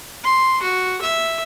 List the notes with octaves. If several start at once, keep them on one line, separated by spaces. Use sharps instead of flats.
C6
F#4
E5